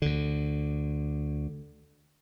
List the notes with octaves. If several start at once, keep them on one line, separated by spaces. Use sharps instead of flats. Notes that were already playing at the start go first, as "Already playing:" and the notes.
D2 D3